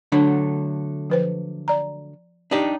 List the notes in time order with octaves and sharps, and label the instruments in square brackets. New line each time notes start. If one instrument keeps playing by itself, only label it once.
[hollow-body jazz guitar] D3 F#3 A3 [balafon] D4
[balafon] F3 B4 C5
D5 A#5
[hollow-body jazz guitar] D4 D#4 G4